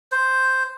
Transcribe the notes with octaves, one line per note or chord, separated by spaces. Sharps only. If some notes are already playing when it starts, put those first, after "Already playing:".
C5